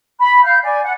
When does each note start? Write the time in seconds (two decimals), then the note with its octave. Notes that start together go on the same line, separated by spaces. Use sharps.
0.19 B5
0.43 F5 G6
0.63 D5 G#5
0.84 F#5